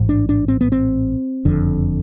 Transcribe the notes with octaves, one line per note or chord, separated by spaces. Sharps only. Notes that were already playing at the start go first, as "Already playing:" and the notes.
Already playing: A1 G#2
D4
D4
C4
B3
C4
F#1 F2 D3